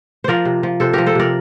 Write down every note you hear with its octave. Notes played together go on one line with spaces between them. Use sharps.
F3 A#4 C5 D5
C3
F3
C3 A4 C5
F3 G4 A#4
A4 C5
C3 A#4 D5